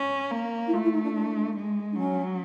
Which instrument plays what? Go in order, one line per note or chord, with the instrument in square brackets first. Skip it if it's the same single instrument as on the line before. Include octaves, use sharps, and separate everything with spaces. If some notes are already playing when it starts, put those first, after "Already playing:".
Already playing: [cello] C#4
A#3
[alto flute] E4
[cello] A3 [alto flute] F4
[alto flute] E4
D#4
D4
D4
[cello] G#3
[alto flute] D4
[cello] F#3 [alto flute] C#4